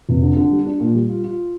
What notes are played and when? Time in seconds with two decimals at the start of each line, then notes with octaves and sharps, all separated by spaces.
0.09 F1
0.23 D3
0.37 D3
0.51 G3
0.66 D4
0.80 A#2
0.95 G3
1.09 F4
1.24 F4